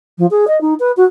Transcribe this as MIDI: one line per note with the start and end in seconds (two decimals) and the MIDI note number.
0.18 0.26 53
0.31 0.45 68
0.48 0.60 75
0.61 0.74 63
0.80 0.92 71
0.97 1.05 66